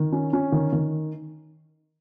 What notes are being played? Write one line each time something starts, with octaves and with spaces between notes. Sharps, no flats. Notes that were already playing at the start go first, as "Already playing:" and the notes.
Already playing: D#3
C#4
C#4
D#3
D#3